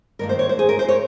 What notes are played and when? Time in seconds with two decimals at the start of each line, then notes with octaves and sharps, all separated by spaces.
0.19 G2 D#3 A#3 A#4
0.29 C5
0.39 C#5
0.49 C5
0.59 G#4
0.69 A#4
0.79 C5
0.89 C#5